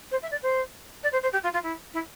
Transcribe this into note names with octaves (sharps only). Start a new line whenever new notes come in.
C5
E5
D5
C5
D5
C5
C5
G4
F4
F4
E4
E4